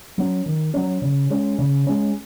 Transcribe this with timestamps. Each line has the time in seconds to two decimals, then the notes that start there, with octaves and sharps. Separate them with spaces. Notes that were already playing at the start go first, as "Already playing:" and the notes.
0.18 F#3 C#4
0.46 D#3
0.74 F#3 C#4
1.02 C#3
1.30 G#3 C#4
1.59 C#3
1.87 G#3 C#4